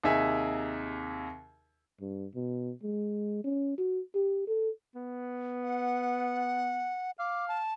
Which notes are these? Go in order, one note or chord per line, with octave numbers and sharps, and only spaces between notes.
D#2 C3 D#4 G#4 E5 G#5
G2
B2
G#3
C#4
F#4
G4
A4
B3
F#5
F5 D6
A5